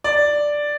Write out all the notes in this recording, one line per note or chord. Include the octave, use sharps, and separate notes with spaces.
D5